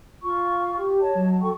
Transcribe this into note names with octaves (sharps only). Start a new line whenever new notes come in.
F4 C#6
G4
C#5 D#5 A5
F#3
A4 G5 C#6